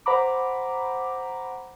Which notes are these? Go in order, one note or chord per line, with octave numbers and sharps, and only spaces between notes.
C5 F#5 A#5 B5 D6